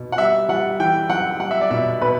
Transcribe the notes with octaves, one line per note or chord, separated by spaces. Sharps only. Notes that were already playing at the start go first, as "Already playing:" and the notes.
Already playing: B2
F#5
G3 E5
G3 F#5
E3 G5
F#2 F#5
G3 F#5
E5
D5
B2 E5
B2 B4